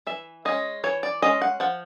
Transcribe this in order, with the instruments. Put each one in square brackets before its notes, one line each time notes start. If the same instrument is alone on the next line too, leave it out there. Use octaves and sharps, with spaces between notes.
[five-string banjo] E3 E5
G#3 C#4 D#5
E3 C#5
D5
G#3 C#4 D#5
F#5
F3 F#5